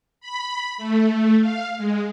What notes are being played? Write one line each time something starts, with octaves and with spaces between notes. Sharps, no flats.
B5
A3
F5
G#3